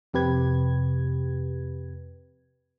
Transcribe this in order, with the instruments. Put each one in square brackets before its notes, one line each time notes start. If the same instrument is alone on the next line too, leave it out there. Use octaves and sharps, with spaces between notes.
[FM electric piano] F2 C3 G4 B4 G#6